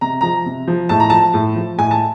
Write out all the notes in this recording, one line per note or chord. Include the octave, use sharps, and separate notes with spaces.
C3 A#5
F3 A#5
C3
F3
A2 A5
A#5
F3 A5
A2
F3
A2 G#5
A5